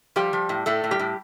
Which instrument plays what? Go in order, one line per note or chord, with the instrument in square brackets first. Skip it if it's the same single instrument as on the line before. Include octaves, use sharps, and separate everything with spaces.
[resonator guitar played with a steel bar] F3 G3 G4
F3
A2
A2 A3 A4
A2
G3 G4
A2